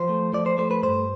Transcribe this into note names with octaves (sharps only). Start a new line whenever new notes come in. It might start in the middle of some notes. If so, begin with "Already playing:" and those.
Already playing: F3 C5
A3
F3 D5
C5
A3 C5
B4
G2 C5